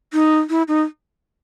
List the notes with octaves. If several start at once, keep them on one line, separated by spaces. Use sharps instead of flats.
D#4
E4
D#4